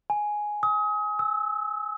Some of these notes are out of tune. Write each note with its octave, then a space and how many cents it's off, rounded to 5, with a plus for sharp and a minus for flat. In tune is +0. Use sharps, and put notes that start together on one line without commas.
G#5 +5
D#6 +35
E6 -20